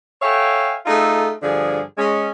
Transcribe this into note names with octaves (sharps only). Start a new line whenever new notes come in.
A4 C#5 E5 F5 G5 G#5
A3 D#4 F4 G#4 A4
G2 D3 F3 G#4
G#3 C#4